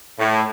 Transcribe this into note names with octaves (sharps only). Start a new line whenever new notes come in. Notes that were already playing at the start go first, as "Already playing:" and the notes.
A2